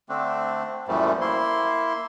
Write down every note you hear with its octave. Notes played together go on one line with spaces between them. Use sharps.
D3 A3 C4 D4
F#2 A#2 E3 F3 G3 A3
A#3 E4 C6